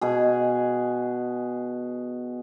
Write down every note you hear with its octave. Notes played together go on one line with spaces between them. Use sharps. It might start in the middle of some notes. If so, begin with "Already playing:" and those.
B2 G#4